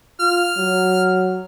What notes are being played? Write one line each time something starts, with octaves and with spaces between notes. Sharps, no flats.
F4 F6
F#3